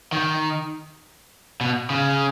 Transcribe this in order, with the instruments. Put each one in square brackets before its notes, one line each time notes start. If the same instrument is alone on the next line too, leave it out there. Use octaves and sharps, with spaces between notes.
[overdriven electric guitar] D#3
B2
C#3